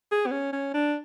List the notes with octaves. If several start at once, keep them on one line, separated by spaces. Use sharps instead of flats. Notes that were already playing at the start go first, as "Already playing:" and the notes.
G#4
B3
C#4
C#4
D4